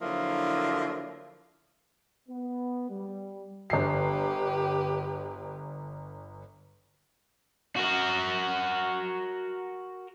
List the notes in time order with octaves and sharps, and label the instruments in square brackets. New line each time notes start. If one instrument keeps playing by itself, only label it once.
[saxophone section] D3 F3 F#3 A#3 E4
[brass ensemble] B3
G3
[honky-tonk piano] G1 C7 [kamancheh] G4 B4
[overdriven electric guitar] F#4 A#4